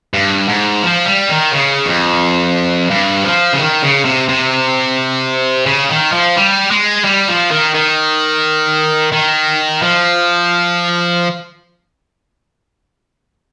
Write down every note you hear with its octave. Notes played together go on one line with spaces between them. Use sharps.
G2
G#2
F3
G3
D#3
C#3
F2
G2
F3
C#3
D#3
C#3
C3
C3
C#3
D#3
F3
G3
G#3
G3
F3
D#3
D#3
D#3
F3